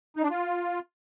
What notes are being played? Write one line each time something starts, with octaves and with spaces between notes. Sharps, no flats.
D#4
D4
F4